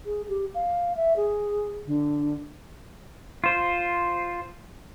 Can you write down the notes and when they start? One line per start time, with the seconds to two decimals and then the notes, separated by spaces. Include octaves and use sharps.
0.05 G#4
0.28 G4
0.54 F5
0.96 E5
1.16 G#4
1.86 D3
3.44 F4 C5